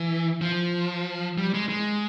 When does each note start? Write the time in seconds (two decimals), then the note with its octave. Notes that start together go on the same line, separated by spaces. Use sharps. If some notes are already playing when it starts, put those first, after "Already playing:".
Already playing: E3
0.41 F3
1.38 G3
1.54 G#3
1.69 G#3